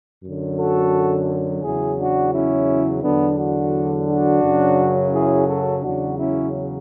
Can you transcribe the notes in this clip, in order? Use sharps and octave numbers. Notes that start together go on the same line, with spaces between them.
F#2 D3 F#3
F#4 A4
E2 C#3 F#3 E4 G#4
D4 F#4
C#4 E4
E2 D3 F#3 B3 D4
D4 F#4
D4 F#4
F#2 C#3 F#3
E4 G#4
F#4 A4
E2 C#3 F#3 D4 F#4
C#4 E4